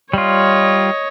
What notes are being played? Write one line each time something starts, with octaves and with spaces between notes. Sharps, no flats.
G3 F4 C#5 D#5